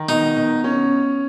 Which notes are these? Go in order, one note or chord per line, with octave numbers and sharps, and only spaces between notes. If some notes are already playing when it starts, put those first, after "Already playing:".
Already playing: D#3
B2 D#4
B2
C#4